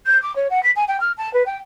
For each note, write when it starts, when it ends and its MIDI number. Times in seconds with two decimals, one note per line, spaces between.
0.06 0.20 91
0.22 0.34 86
0.35 0.47 73
0.50 0.62 78
0.63 0.71 95
0.76 0.84 80
0.88 0.97 79
1.00 1.11 89
1.17 1.32 81
1.33 1.43 71
1.46 1.57 79